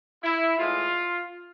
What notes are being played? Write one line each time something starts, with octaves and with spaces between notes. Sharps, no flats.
E4
A2 E3 G#3 F4